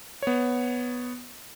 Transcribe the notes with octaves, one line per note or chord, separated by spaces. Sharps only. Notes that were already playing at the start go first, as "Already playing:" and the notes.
B3 C#5